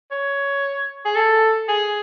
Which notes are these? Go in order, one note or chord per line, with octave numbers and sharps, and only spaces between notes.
C#5
G#4
A4
G#4